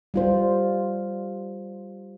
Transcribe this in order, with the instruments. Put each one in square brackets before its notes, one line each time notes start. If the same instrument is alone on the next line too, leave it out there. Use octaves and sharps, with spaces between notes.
[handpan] G3 F4 C5